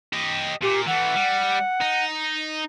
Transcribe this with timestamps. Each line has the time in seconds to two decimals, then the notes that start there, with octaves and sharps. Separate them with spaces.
0.13 G4 D#5
0.63 A#2 G4
0.87 E3 A3 F#5
1.15 G3
1.81 D#4